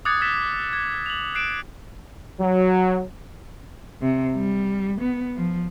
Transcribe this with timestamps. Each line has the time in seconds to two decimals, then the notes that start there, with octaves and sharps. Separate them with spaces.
0.05 D6 D#6 F#6 G#6 A6 C#7
0.21 D#6 E6 F#6 A6 B6 E7
0.73 G#6
1.06 F7 F#7
1.35 F#6 C7 D7 E7
2.39 F#3
4.02 C3
4.36 G3
5.01 B3
5.37 F3